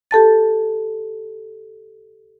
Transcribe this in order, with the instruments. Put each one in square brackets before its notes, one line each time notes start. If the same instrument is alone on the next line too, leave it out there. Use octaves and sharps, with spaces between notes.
[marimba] G4 A4 A5 A6